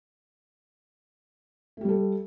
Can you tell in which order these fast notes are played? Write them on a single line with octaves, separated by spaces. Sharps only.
A3 G4 G3 A4